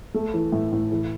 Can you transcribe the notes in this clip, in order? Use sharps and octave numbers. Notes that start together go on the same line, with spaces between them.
A3
E3
A2
A2
E3